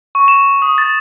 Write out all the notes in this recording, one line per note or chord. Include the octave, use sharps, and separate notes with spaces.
C#6
E7
D#6
A6